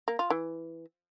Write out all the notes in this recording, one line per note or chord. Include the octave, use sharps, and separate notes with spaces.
A#3
F4
E3